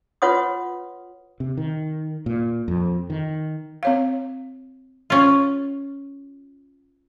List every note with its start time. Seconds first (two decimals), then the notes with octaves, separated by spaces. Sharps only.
0.22 F4 B4 C#5 F#5 C6 D#6
1.40 C3
1.57 D#3
2.26 A#2
2.68 F2
3.10 D#3
3.83 C4 C#5 F5
5.10 C#4 F4